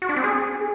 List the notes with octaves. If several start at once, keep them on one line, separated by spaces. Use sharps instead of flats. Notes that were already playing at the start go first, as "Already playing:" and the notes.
F#4
D4
C4
G#4